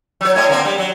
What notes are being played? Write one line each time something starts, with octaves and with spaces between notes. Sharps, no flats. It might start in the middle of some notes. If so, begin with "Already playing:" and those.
F#3 C#5
A2 C#5 D#5
D3 A#3 C4
G3
F#3